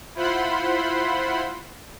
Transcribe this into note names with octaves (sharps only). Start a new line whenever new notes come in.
E4 F4 C5 F#5 B5 C6